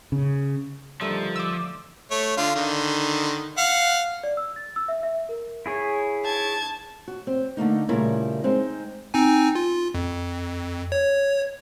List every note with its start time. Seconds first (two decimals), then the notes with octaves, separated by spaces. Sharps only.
0.12 C#3
1.01 D3 D#3 F3 G3 A3
1.36 D5 D6 E6
2.11 A3 C#5
2.37 D3 F4
2.56 D3 D#3
3.58 F5 F#5
4.23 D5
4.37 E6
4.56 A6
4.76 E6
4.88 E5
5.03 E5
5.29 A#4
5.66 E4 G#4 C#5
6.25 A5 G#6
7.08 F#4
7.27 C4
7.57 D3 A3 A#3 D#4
7.89 A#2 C#3 G3 A3 E4 A#4
8.44 G#3 C4 D#4
9.14 C4 D#4 G#5
9.55 F4
9.94 F2
10.92 C#5